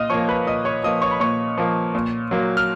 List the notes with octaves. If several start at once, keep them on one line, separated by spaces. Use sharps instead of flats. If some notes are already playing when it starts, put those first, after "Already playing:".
Already playing: A#2 D#5 F5 D#6 F6
F3 A#3 C#5 C#6
B4 B5
A#2 D#5 D#6
C#5 C#6
F3 A#3 D#5 D#6
C#5 C#6
B5
A#2 C#5 C#6
F3 A#3
A#2
F#3 A#3
F6